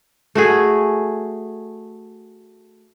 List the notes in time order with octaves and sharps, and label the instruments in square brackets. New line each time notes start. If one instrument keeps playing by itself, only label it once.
[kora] A3 F#4 G#4